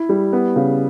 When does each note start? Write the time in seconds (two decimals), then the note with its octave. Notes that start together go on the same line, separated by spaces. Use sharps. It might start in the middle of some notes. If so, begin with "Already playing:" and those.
Already playing: E4
0.09 G3
0.33 B3
0.56 C#3